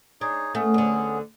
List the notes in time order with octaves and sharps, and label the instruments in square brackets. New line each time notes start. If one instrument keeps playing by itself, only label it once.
[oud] D4 [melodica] D#4 G#4 C#5
[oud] A3 [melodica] B3 C#4 G#4
[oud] D2 D3